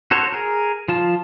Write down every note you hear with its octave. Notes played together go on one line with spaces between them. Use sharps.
F#4 A4 C5 C#5
G#4 A#4
F3 F4 A5